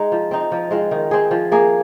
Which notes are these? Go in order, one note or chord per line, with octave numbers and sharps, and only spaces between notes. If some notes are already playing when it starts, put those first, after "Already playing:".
Already playing: G#3 D#4
F3
C4 D#4
F3
G#3 C4 F4
D#3
C4 G#4
F3
A#3 G#4